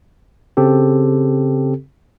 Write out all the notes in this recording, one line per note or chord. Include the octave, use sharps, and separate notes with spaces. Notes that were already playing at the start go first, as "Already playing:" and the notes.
C#3 C4 G4 A4